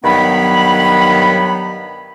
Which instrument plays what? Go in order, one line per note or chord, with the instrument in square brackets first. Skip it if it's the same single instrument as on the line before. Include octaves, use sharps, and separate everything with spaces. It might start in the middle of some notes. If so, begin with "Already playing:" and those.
[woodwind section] G2 D#3 F#3 B3 B5